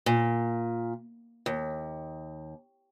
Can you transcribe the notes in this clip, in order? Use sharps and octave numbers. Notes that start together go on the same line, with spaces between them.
A#2
D#2